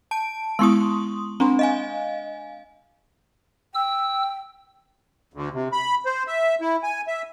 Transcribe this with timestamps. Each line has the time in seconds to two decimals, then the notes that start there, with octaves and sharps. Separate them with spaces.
0.11 A5 D7
0.59 G#3 B3 E4 C6 C#6 D#6
1.40 C4 D4 A#5 C6
1.59 D#5 F5 G#5
3.75 G5 E6
5.34 D2
5.54 C3
5.72 B5
6.06 C5
6.27 E5
6.61 E4
6.83 G#5
7.07 E5